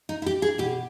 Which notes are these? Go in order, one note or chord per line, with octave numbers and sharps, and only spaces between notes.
D#4
E4
G4
G#4
B2 G4